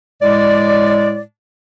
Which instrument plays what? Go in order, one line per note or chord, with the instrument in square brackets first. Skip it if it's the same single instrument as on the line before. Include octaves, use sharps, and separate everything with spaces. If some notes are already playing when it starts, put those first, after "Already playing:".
[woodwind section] A2 G#3 D5